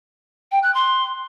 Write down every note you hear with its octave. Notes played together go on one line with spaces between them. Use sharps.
G5
F#6
C6